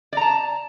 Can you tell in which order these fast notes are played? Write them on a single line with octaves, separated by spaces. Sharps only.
D5 A#5 A5